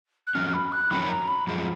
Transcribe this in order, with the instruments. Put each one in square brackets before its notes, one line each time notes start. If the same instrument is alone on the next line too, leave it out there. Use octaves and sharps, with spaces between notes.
[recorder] F#6
[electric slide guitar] F2 D#3 F#3 C#4 [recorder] F6
[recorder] B5
F#6
[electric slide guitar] F2 D#3 F#3 C#4 [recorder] B5
[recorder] A#5
B5
[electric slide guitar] F#2 F3 G#3